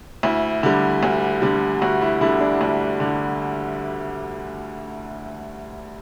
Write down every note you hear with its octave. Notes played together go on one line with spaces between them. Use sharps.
D2 E4
D3 G3
D2
D3 G3
D2 F#4
E4
D3 G3 E4
D4
D2
D3 G3